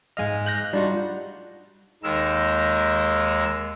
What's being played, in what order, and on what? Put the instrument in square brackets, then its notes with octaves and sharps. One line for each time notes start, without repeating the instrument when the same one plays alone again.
[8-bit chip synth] G#2 G#3 F6 [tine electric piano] D#5 F5 G#5
[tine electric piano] F#6 G6 A#6
[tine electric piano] G3 F4 [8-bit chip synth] D4 D#4 F#4
[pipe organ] D#2 D#3 G#3 A#4 E6